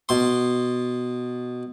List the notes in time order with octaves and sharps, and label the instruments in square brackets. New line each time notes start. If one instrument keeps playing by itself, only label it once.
[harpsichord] B2 C6